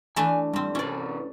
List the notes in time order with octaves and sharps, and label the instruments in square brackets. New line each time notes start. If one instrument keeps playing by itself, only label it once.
[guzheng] E3 A3 D4 [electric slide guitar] G#5
[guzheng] G2 C4 [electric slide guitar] G3
[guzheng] C#4 D5 [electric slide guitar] D4 E4 B4